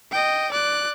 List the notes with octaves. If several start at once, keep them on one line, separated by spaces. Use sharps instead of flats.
D#5 G5
D5 F#6